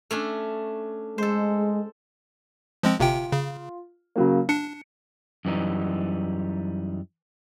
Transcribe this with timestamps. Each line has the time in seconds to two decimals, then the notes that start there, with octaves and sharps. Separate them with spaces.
0.11 A3 C#4 D4
1.18 G#3 A4 C5
2.83 F3 G#3 C4
3.00 G1 C3 F4 G5
3.32 C#3
4.16 C#3 F#3 A#3
4.49 D4 C#7
5.45 F#2 E3 G3 D#4